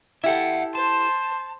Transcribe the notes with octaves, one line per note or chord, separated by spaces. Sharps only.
E4 G4 A4 E5 F#5
C5 A5